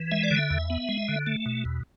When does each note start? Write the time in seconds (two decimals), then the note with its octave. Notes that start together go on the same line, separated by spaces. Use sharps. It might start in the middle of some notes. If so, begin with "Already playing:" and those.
Already playing: E3
0.12 G#3 E5
0.23 D5
0.31 D3
0.36 E5
0.50 E2
0.70 B3
0.89 G#3
1.09 D3
1.27 A3
1.46 B2
1.65 E2